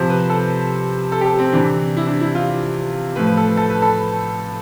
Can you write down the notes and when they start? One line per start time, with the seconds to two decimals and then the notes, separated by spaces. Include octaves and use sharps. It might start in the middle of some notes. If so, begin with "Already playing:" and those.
Already playing: C3 F3 C5
0.09 B4
0.30 A4
1.12 A4
1.21 G4
1.26 A4
1.39 C4
1.53 C3 E3 D4
1.97 E4
2.07 D4
2.21 E4
2.35 F4
3.16 A2 F3 B4
3.27 B4
3.37 A4
3.57 A4
3.70 B4
3.82 A4